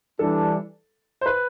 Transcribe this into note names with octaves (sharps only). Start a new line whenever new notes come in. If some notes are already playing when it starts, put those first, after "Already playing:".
E3 G3 D4 A4
C5
B4